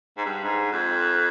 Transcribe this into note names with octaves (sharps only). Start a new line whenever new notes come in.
G#2
G2
G#2
F2